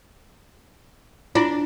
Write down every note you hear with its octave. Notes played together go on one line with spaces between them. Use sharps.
D4 E4 F4